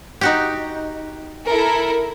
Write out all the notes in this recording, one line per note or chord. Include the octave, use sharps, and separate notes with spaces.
D#4 F#4 G4
E4 A4 A#4